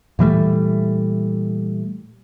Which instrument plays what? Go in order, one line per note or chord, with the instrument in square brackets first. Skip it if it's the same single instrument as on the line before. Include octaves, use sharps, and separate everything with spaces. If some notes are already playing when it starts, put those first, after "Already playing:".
[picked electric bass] A#2 E3 G3 A3